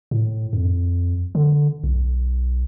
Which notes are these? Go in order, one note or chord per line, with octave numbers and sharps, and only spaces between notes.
A2
F2
D3
B1